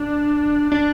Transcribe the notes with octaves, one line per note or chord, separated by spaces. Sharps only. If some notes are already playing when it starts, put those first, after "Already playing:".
Already playing: D4
D4